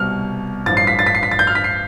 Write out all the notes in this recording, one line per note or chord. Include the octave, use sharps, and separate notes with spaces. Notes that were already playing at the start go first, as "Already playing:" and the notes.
Already playing: C2 B2 G3 C4 F6
A1 G2 F3 A6
C7
B6
A6
B6
C7
B6
A6
G6
F6
B6
C7